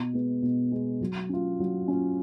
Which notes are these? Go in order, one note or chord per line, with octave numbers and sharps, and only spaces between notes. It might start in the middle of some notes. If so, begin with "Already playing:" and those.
Already playing: B2
G#3 B3
B2
G#3 B3
F#3
C#4 F4
F#3
C#4 F4